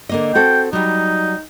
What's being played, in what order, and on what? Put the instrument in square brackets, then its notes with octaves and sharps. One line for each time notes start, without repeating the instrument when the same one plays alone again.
[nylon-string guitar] D3 A#3 D#5
[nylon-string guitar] C4 F#4 A4 [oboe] G5
[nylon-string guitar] F#3 G3 [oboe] D#4